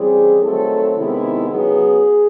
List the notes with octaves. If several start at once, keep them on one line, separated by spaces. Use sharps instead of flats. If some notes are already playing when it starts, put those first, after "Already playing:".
Already playing: C#3 E3 G3 C4 G#4
D#3 F#3 A3 C4 A4
C3 D#3 G#3 B3 E4
C#3 F#3 B3 G#4